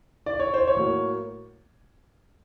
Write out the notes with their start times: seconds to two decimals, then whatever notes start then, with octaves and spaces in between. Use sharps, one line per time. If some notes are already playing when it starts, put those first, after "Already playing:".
0.26 D5
0.40 C#5
0.54 C5
0.68 C#5
0.77 A2 F#3 A#3